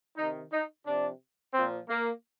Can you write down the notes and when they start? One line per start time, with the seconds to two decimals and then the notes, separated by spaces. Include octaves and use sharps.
0.17 C3 D#3 D#4
0.51 D#4
0.86 C3 F3 D4
1.54 A#2 F3 C4
1.88 A#3